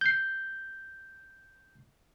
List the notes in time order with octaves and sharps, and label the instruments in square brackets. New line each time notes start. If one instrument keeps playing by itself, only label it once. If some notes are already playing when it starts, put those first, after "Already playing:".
[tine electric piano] G6 C7